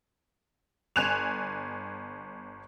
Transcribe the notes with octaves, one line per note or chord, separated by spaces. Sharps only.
G1 G#5 F#6 E7 F7